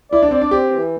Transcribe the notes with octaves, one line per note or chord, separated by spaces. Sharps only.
E4 D5
D4
C4 D5
D4
C4 G4
E3